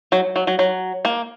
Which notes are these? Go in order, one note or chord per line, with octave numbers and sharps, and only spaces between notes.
F#3
F#3
F#3
F#3
A#3